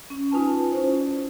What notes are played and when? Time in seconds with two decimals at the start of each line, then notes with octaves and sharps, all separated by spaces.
0.10 C#4
0.31 D#4 F4 B4 G#5 A5
0.72 C#4 E4 C5
1.00 D5